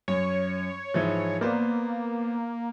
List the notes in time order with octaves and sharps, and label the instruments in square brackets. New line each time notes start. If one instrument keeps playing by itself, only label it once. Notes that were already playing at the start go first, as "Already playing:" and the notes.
[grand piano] F#2 [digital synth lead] C#5
[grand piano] G#2 E3 F3
[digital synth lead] A#3 [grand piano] B3 C5 D5